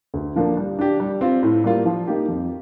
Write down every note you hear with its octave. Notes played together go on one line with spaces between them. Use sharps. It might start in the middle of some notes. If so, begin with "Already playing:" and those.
D2
D3 F3 A#3 D4
G3
D4 G4
G3
C4 F4
A2
G3 A#3 F4
F3
A#3 D#4 G4
F2